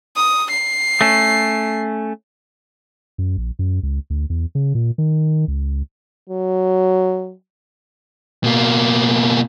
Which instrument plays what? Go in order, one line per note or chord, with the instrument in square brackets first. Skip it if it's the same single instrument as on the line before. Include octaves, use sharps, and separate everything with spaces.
[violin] D#6
C7
[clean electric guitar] A3 C#4
[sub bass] F#2
A#1
F#2
C#2
D2
E2
C#3
A#2
D#3
C#2
[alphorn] F#3
[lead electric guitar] B2 A#3